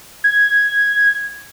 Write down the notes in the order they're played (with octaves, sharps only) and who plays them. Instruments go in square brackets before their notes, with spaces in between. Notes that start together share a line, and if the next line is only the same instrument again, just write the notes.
[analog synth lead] G#6